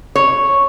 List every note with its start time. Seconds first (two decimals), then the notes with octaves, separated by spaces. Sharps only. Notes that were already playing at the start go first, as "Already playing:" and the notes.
0.16 C#5